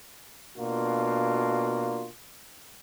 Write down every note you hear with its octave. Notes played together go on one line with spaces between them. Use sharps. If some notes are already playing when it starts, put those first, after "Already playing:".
B2 A#3 D4 F4 F#4